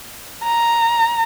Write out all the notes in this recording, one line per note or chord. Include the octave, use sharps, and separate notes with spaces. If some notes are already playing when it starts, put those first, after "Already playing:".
A#5